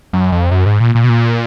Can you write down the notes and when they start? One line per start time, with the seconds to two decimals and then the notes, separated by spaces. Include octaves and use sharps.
0.13 F#2
0.32 F2
0.51 F#2
0.66 G#2
0.80 A#2
0.95 A#2
1.04 B2
1.09 A#2